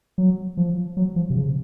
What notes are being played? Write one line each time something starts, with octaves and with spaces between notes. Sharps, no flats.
F#3
F3
F#3
F3
C3
C#3